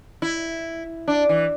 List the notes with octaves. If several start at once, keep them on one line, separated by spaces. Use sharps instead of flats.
E4
D4
E3